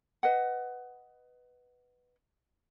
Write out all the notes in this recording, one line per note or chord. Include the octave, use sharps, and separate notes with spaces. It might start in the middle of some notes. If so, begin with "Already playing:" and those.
B4 D#5 F#5